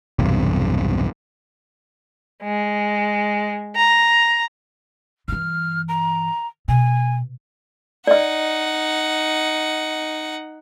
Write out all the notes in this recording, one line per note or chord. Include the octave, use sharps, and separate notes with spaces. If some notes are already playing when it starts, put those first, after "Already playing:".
B1 E2 G2 C3
G#3
A#5
G2 E3 F6
A#5
B2 G#5
D#4 D5 D#5 F#5